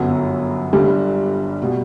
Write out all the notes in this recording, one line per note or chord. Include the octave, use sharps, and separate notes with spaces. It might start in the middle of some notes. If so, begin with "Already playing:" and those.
Already playing: G1 F#2 F#3 B3 F#4
G1 G2 D3 G3
B2 G3